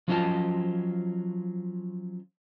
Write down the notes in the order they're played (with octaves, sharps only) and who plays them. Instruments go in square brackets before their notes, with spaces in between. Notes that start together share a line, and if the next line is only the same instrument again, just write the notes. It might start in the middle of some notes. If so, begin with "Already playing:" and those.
[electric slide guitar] F3 F#3 C#4 F4 D#5 A5